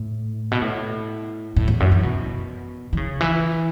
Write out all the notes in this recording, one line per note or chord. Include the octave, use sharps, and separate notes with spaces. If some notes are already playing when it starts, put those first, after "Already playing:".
Already playing: A2
B2
A2
A2
E2
F#2
E3
B2
E3
C#3
E3